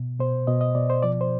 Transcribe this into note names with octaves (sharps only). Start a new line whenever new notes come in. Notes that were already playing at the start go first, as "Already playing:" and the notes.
Already playing: B2
B2 C5
B2 D#5
D#5
B2 D5
C5
F3 D5
C5